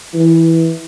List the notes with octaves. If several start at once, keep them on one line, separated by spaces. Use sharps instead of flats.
E3